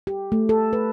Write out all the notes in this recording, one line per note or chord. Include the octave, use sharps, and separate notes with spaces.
G4
A3
A4
B4